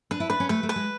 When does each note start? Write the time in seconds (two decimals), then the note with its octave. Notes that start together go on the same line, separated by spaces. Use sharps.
0.11 D4 B4
0.20 E4
0.30 D4 B4
0.40 C#4
0.49 A3 B4
0.63 A3
0.69 B4
0.76 G#3